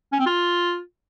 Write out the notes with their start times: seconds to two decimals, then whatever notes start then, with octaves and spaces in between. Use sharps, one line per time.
0.12 C#4
0.19 C4
0.26 F4